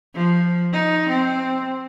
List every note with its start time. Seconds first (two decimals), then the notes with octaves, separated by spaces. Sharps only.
0.15 F3
0.73 D#4
1.09 C4